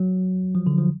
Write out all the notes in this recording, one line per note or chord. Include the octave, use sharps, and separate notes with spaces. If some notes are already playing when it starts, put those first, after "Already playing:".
Already playing: F#3
F3
D3
F3